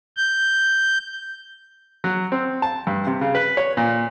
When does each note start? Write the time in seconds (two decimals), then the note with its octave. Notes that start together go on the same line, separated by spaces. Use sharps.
0.17 G6
2.04 F#3
2.32 C4
2.62 A5
2.87 G2
3.07 C3
3.21 C#3
3.35 B4
3.57 C#5
3.77 A#2